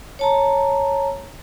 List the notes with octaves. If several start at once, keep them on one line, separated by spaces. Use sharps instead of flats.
C#5 A5 A#5